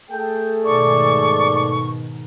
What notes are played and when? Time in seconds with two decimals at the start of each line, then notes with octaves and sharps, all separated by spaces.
0.10 A3 G#4 A4 G5
0.65 G#2 B2 D#3 D5 C#6